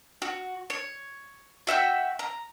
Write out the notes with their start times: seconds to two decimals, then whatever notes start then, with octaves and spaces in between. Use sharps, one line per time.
0.22 F#4
0.70 C#5
1.67 F#4 E5 F#5 G5
2.19 A#5